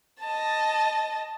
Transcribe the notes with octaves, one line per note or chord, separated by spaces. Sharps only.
D#5 A5